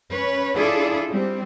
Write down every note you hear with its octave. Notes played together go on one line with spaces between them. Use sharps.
C#4 B4 C#5
D4 E4 F4 G#4 A4 D5
G3 C4